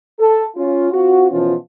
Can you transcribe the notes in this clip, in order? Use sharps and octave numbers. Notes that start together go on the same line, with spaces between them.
A4
C#4 F4
C4 F4 F#4
B2 E3 F3 C#4 F4